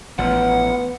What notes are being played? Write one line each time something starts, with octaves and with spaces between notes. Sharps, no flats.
A1 F3 B3 F#5